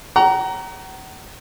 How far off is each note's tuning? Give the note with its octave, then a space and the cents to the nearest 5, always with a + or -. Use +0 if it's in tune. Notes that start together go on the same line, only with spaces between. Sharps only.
F#5 +40 A#5 +0